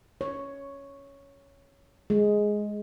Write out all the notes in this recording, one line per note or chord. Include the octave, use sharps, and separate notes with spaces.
C#5
G#3